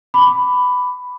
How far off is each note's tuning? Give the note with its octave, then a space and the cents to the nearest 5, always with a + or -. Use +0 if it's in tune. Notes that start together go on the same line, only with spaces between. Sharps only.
B5 +10 D6 +0